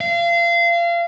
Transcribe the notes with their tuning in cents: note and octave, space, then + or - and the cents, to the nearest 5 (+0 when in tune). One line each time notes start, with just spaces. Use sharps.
F5 -30